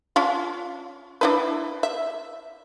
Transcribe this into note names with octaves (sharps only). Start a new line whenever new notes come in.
C#4 D4 F4
D4 E4 B4
E5